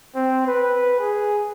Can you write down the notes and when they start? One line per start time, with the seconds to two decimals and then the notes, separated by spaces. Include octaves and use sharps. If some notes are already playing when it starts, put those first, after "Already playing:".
0.15 C4
0.47 B4
0.99 G#4